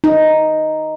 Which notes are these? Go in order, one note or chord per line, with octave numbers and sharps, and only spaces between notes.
D#4